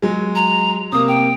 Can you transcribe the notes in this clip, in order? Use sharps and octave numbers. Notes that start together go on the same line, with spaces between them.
F#3 G#3
A#5
C3 A#3 D#6
G5